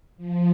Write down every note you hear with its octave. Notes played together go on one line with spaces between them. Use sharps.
F3